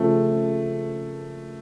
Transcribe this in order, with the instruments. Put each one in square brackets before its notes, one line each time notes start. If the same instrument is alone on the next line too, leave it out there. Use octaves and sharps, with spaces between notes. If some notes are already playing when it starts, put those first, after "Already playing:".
Already playing: [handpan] C#3 F3 C4 [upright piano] A3